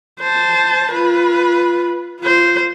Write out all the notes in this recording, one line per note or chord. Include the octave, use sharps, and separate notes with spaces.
C5 A5
F4 B4
F4 C5